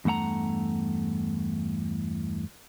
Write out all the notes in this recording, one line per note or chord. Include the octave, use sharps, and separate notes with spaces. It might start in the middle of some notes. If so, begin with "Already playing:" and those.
E2 G2 A3 F#5 A#5